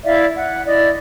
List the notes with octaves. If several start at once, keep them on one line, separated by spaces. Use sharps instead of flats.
E4 D5 E5 F5
F#5
E4 D5 D#5